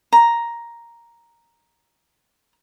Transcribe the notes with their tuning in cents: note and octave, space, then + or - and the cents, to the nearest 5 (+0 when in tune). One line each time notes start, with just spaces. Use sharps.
A#5 +5